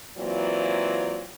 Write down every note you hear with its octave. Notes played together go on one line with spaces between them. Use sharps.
E3 F#3 A#3 C4 F4 D5